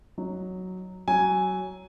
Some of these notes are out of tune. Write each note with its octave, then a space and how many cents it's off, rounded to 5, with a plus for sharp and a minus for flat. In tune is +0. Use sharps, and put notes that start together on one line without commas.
F#3 +0 D#4 -10
F#3 +15 G#5 +0